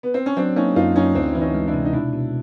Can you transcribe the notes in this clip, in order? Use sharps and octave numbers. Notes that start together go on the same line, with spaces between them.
B3
C4
C#4
F#3 C4 D4
A#3 C#4 D#4
F#2 D#4 F4
F#2 C#4 D#4
D2 C4 D4
E3 E4
C#4 D#4
G#3
D4 E4
C3
D#4
B2 D4 E4
B2